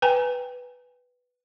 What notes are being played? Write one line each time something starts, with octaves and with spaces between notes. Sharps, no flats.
B4 G5 G#5 A#5